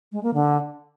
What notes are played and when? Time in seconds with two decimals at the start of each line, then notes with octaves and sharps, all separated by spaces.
0.12 G#3
0.23 A#3
0.34 D3